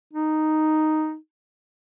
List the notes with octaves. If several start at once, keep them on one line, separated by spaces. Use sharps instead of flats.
D#4